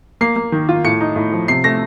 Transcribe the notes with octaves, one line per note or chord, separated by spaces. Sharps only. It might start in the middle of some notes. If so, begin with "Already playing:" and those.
A#3 C7
A#3
D#3
F4
A2 C#7
D#4
A2
F3
C3 C7
A3 A#6